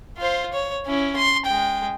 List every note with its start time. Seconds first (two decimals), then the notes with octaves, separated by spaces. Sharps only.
0.18 F4 C5
0.53 C#5
0.86 C#4 E4
1.16 C6
1.46 G#3 G5